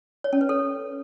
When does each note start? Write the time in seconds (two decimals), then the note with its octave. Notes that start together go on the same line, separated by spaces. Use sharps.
0.24 C#5
0.33 C#4
0.41 B4
0.49 A4